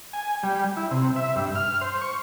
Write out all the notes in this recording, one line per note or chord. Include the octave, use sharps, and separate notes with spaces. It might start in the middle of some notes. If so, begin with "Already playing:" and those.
G#5
G3
E4
C3
E5
G2
F6
C5
C#6